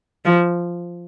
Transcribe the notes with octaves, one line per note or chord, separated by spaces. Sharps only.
F3